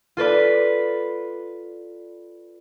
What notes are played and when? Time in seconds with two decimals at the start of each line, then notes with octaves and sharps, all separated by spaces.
0.17 F4 A4 B4 D5